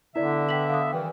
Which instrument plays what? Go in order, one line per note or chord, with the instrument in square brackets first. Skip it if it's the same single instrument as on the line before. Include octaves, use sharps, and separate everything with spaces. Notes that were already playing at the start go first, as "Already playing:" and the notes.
[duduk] D3 [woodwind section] B3 E5 [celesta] E4 D5
[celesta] G5 B6 F#7
F5 D#6
[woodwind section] G2 D#3 E3 [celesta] G5